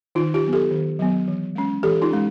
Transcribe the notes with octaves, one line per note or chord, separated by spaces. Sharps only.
D#3 D#4 F4
F4 G4
F#3 B3
G4 A4
D#3
F#3 B3
E3
G#3 C#4
E3 G4 A4
D#4 F4
G#3 C#4